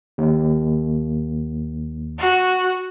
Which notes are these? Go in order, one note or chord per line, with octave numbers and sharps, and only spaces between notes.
D#2
F#4